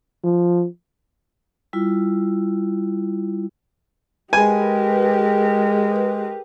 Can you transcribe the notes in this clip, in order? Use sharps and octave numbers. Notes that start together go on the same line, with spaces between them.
F3
G3 E4 F4
G#3 G4 G#4 A#4 B4 G#5